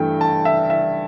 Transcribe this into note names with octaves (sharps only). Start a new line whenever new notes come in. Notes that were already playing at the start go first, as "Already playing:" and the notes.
Already playing: G2 E3 A3 G5
A5
E5
E5